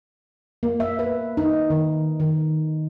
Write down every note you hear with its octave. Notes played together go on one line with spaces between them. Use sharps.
A#3
E5
B4
D#4
D#3
D#3